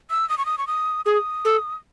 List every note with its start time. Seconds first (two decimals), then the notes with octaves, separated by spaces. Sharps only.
0.10 E6
0.29 D#6
0.38 C#6
0.46 D#6
0.58 C#6
0.67 D#6
1.05 G#4 D#6
1.45 A4